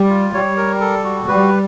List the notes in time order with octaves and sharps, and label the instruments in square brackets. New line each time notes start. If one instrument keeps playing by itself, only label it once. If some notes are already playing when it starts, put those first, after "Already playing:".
Already playing: [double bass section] G3
[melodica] F4
[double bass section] G3 [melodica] C#5
[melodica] A#4
A4
F#4
[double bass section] G3 [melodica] B4